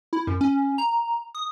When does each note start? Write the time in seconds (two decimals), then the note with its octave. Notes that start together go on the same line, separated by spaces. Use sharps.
0.13 E4
0.27 F#2
0.41 C#4
0.78 A#5
1.35 D#6